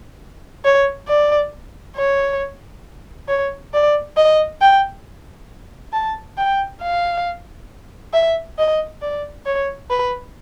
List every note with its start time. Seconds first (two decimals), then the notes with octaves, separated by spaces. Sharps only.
0.65 C#5
1.08 D5
1.96 C#5
3.28 C#5
3.73 D5
4.17 D#5
4.61 G5
5.92 A5
6.37 G5
6.82 F5
8.13 E5
8.58 D#5
9.01 D5
9.46 C#5
9.90 B4